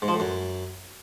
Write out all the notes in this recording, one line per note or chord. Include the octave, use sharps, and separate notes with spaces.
G#2
F3
A2
F#2